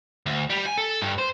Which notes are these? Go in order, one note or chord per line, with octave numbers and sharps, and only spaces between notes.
D2
G3
G#5
A4
G2
C5